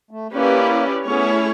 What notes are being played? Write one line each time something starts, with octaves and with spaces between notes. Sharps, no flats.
A3
A#3 C#4 E4 G4 B4 D5
A3 B3 C#4 E4 G#4 C#5